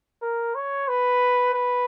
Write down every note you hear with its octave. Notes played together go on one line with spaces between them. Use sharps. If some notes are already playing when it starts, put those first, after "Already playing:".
A#4
C#5
B4
B4